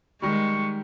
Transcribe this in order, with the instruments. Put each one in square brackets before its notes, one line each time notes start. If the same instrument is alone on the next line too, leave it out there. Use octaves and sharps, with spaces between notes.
[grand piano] D#3 G3 [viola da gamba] G#3 [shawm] C#6